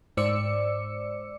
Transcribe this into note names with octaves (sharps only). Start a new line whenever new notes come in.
G#2 C5 D5 D6 E6 C#7